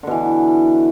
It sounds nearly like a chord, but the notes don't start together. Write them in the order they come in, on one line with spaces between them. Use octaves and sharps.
D3 B2 E3